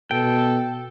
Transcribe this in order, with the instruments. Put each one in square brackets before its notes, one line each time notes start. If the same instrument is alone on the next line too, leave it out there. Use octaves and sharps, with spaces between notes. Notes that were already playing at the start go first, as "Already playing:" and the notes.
[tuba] B2 [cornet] A4 [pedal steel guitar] G5